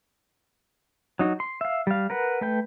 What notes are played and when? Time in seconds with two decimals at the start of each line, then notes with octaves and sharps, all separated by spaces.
1.19 F#3 D#4 F#4
1.40 C6
1.61 E5 F5
1.87 G3 F5
2.10 A#4 B4 F#5
2.41 A3 B4 G5